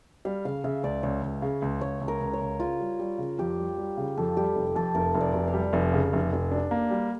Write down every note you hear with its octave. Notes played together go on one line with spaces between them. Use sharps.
G3 F5
C#3 F5
C#3 E5
C#2 D5
C#2 C#5
C#2
C#3
C#2
C#2 C#5
C#2
A#4
C#2
C#5
C#2
C#3 F4
G3
G3
C#3
F2 G4
G3
G3
C#3
F2 A4
G3 G4
F1
F2 A4
F1 A#4
F1
D5
F1
F5
G3
F1 F5
C#3
F1
F1
D4
A#3
G3